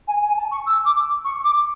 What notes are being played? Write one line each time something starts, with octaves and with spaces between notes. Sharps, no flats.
G#5
G#5
A5
C#6
E6
D6
C#6
D6